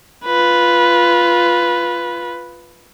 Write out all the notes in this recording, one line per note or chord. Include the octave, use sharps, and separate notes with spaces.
F4 B4